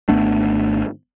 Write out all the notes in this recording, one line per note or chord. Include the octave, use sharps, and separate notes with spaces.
G#1 A3 B3 D4